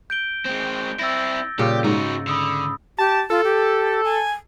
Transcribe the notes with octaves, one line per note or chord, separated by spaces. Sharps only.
G6 D7 G7
G#3 C4
C4 E4 E6 A6 A#6
A#2 C#3 G3 G4
G#2 D#4 F#4
D3 B5 D#6 E6
G4 A5
F4 A4
G4
G#5